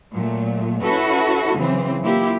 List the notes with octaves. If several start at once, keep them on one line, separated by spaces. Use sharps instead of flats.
A#2 F#3 A3
C#4 E4 F#4 A4 B4
C#3 E3 F#3 C4
A#3 E4 F4 G4